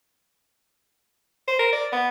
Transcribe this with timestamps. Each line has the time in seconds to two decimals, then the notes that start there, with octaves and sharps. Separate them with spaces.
1.48 C5
1.59 A#4
1.73 D5
1.92 B3